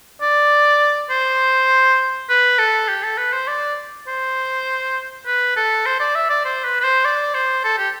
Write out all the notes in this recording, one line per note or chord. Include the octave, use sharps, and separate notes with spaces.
D5
C5
B4
A4
G4
A4
B4
C5
D5
C5
B4
A4
C5
D5
E5
D5
C5
B4
B4
C5
D5
C5
A4
G4